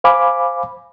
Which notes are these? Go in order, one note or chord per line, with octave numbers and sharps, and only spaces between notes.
C5 F5 G#5 B5 D6